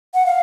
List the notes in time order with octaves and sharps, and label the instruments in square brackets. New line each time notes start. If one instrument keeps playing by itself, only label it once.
[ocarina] F#5
F5